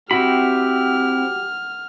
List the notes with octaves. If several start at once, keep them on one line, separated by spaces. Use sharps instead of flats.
C4 E4 F#4 G4 B5 F6